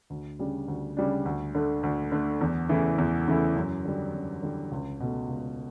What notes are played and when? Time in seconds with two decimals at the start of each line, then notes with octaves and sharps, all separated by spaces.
0.10 D2
0.39 C#3 G3 D4
0.68 D2
0.97 C#3 G3 D4
1.25 D2
1.55 D3 A3
1.83 D2
2.12 D3 A3
2.41 E2
2.69 C#3 E3 A3 E4
2.98 E2
3.27 C#3 E3 A3 E4
3.56 F#2
3.85 D3 G3
4.14 F#2
4.42 D3 G3
4.71 C#2
5.00 B2 A3
5.29 C#2